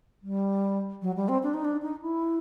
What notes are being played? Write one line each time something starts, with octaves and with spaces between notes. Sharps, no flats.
G3
F#3
G3
C4
D4
D#4
D4
D#4
E4